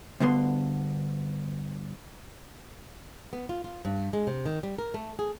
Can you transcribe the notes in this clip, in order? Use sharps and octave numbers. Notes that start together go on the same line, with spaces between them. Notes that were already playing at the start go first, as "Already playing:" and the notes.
D2 G2 D3 B3 C6
B3
F4
F4
G2
G#3
C3
D#3
G3
A#4
A3
G#4